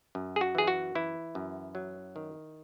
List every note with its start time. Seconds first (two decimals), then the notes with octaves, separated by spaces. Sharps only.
0.15 F#2
0.36 G#4
0.41 F#4
0.55 E3 G#4
0.67 F#4
0.95 E3 E4
1.35 F#2
1.75 F#3
2.16 D#3